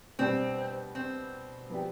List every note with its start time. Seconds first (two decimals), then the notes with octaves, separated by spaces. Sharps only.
0.19 B2 G3 C4 D4 G4
0.95 C4
1.70 F3 B3 D4 G4